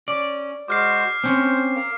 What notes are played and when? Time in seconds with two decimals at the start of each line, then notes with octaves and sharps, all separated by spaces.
0.08 C#4 D5
0.68 G#3 F#4 C5 D6 F6 C7
1.24 C4 C#4 C5
1.76 A#4 F5